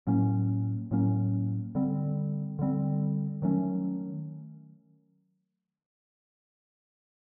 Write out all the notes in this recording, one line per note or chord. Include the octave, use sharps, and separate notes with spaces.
A2 F#3 A#3 C#4
A2 F#3 A#3 C#4
D3 G3 C4
D3 G3 C4
D#3 F#3 A3 C#4